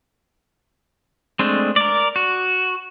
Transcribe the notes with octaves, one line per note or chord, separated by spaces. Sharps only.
G#3 A3 C4 D4
A#4 D5
F#4